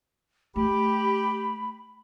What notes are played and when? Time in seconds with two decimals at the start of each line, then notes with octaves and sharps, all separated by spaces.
0.56 A3 G4 B5